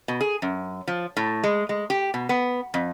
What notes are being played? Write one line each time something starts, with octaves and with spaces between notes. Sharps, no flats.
B2
G#4
F#2
F3
A2
G#3
G#3
G4
B2
B3
F2